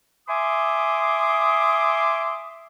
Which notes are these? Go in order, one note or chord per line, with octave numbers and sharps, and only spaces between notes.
E5 G#5 C6 D6 D#6